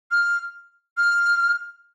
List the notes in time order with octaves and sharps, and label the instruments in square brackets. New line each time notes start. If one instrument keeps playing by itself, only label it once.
[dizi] F6
F6